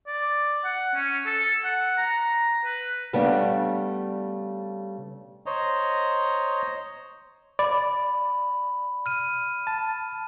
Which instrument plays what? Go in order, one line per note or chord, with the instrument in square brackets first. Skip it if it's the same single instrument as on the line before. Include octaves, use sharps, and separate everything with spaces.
[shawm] D5
F#5
C#4
A4
F#5
A#5
B4
[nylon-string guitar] C#3 G3 A3 B3 D4
[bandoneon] C5 C#5 D#5 A#5
[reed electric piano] D5 [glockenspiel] B5
[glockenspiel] F6 D#7
[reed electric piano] A5